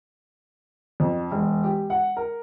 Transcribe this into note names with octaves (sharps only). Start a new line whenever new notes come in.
F2
E1
G4
F#5
A#4